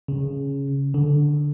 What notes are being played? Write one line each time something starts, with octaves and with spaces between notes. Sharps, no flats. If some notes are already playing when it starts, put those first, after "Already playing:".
C#3
D3